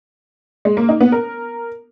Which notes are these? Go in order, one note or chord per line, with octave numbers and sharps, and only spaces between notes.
G#3
A#3
D#4
B3
A#4